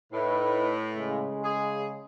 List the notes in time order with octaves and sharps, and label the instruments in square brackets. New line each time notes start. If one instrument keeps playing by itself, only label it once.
[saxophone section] A2 [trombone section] D#4 E4 B4
[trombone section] C#3 G#3
[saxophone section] G#4